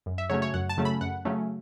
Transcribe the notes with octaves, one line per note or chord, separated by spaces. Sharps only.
F#2
E5
C#3 F#3 A3 C#4 C#5
C#5
F#2 F#5
A5
C#3 F#3 A3 C#4
B5
F#2 F#5
C#3 F#3 A3 C#4